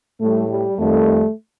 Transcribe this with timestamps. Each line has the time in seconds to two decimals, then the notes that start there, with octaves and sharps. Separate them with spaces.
0.20 A2 G3 A3
0.50 G3
0.78 F2 D#3 G3 A3